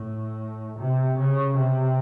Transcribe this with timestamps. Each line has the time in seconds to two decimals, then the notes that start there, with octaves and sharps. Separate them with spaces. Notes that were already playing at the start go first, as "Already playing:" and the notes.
Already playing: A2
0.79 C3
1.18 C#3
1.57 C3